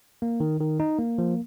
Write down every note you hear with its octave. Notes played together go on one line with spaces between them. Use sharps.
A#3
D#3
D#3
D#4
A#3
F3